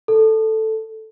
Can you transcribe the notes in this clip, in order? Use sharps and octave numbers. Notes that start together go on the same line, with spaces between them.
A4